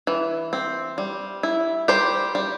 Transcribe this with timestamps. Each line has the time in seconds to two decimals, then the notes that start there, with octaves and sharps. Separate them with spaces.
0.07 E3
0.53 C4
0.98 G3
1.43 E4
1.88 G3 G4 C5
2.35 G3